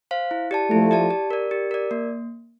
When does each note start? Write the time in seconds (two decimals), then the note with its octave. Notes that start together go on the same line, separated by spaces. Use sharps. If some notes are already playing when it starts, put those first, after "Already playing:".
0.11 C5 F5
0.31 E4
0.51 G4 D5 A5
0.71 F3 A3 E4
0.91 G4 D5 A5
1.11 G4
1.31 A#4 D5
1.51 G4
1.71 A#4 D5
1.91 A#3